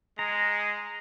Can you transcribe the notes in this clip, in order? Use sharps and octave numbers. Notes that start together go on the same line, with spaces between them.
G#3 A#5